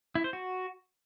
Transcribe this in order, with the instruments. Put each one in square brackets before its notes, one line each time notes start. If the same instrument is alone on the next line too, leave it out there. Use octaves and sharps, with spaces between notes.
[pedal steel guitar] E4
C5
F#4